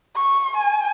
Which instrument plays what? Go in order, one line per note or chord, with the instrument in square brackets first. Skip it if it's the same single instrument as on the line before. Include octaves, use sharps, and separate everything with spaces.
[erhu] C#6
G#5